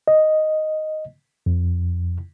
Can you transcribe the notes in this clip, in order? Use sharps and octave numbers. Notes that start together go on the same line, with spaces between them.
D#5
F2